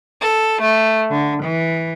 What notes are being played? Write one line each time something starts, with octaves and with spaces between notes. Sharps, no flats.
A4
A3
D3
E3